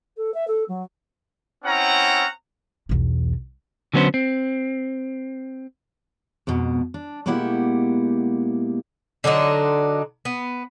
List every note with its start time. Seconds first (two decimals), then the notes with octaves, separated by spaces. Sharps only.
0.17 A4
0.33 E5
0.47 A4
0.68 F#3
1.65 C4 C#4 E4 F#5 A#5
2.89 B1 E2
3.94 D3 F#3 B3 C#4 C5
4.14 C4
6.47 F2 G#2 B2
6.94 D4
7.26 B2 G#3 A#3 E4 G4 F#5
9.24 D3 F#3 D4 D#4
10.25 B3